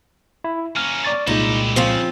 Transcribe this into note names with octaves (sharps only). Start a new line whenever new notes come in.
E4
A#3 C#4 F6
D5 C#6 A6
C2 A#2 G#3 D#4 E4 G4
C#3 F3 C4 F4